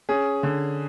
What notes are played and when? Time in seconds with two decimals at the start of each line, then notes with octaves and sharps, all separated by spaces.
0.09 C#4 G#4
0.43 D3